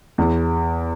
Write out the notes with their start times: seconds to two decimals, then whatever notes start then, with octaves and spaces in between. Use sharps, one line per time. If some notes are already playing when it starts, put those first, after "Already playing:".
0.18 E2